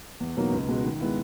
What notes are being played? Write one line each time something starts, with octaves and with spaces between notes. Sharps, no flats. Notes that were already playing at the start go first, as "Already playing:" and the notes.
E2
B2 F#3 A#3 D#4
C#2
B2 G#3
D#3
G#3 B3 E4